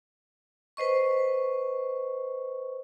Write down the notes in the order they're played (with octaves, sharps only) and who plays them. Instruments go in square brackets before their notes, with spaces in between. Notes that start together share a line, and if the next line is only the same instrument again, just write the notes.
[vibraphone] B4 C5 D#5 C#6